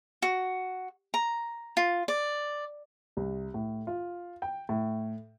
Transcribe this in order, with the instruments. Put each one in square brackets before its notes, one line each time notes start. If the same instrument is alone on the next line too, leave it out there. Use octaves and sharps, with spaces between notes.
[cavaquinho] F#4
A#5
F4
D5
[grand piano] C2
A2
F4
G5
A2